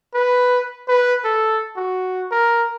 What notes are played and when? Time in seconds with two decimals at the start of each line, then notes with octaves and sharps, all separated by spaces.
0.14 B4
0.88 B4
1.24 A4
1.76 F#4
2.31 A#4